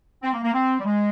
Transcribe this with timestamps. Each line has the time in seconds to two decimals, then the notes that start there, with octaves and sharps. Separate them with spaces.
0.22 C4
0.32 A#3
0.43 A#3
0.53 C4
0.80 G3
0.85 G#3